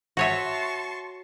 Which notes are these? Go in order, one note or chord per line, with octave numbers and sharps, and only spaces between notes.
F#4 C#5 E5 A5 C6 C#6